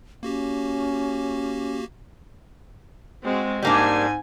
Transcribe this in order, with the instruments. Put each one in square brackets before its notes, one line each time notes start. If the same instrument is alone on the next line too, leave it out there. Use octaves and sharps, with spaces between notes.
[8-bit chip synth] A#3 F#4 G4 [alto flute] C#4
[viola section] G#3 C4 F#4
[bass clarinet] G#2 [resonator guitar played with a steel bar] G3 A#3 D4 [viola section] G#5